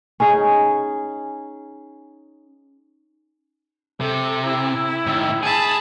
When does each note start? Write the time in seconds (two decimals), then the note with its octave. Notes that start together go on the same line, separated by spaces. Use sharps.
0.20 C#4 D#4 G#4
4.01 C3 A4
4.44 E4
5.06 A2 D#3
5.43 G#4 A5 B5